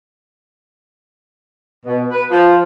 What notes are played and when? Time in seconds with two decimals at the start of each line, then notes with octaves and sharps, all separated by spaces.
1.86 B2
2.11 B4
2.31 F3